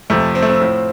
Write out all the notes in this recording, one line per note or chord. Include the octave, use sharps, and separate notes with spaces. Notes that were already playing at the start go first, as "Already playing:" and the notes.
F2 C3 F3 A3
C4
A3
C4
A2 F3